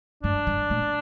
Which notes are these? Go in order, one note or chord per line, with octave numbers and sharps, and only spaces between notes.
G2 D4
G2
A#2